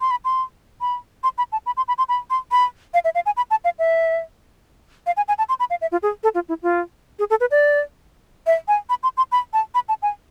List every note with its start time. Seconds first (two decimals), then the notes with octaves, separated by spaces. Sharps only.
0.01 C6
0.11 B5
0.25 C6
0.81 B5
1.23 C6
1.38 B5
1.52 A5
1.66 B5
1.77 C6
1.88 B5
1.98 C6
2.09 B5
2.30 C6
2.52 B5
2.94 F5
3.05 E5
3.15 F5
3.26 G#5
3.37 B5
3.51 A5
3.64 F5
3.79 E5
5.06 F5
5.17 G#5
5.28 G#5
5.38 A5
5.49 C6
5.60 B5
5.70 F5
5.81 E5
5.92 F4
6.03 G#4
6.23 A4
6.35 F4
6.49 E4
6.63 F4
7.19 G#4
7.30 A4
7.40 B4
7.51 D5
8.47 E5
8.68 G#5
8.90 B5
9.03 C6
9.17 C6
9.32 B5
9.53 A5
9.75 B5
9.89 A5
10.02 G#5